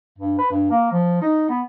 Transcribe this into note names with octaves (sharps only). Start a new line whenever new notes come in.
G2
B4
G2
A#3
F3
D#4
B3